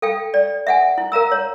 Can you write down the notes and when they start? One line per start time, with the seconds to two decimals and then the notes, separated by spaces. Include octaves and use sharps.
0.02 A4 F5 G5
0.34 D5
0.67 E5 F#5 G#5
0.98 E4
1.12 A#4 F5 A#5 E6
1.32 C#5